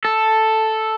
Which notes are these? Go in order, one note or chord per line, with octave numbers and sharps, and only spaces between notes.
A4